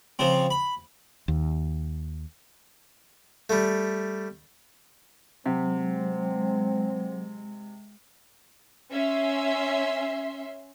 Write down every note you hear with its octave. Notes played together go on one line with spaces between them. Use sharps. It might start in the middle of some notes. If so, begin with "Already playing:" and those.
C#3 F3 C4
B5
D#2
G3 A3
C3 F#3 G#3 C4
C#4 E5 C6